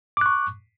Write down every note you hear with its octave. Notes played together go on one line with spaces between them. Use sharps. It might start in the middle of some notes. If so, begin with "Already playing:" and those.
C#6 D6 F#6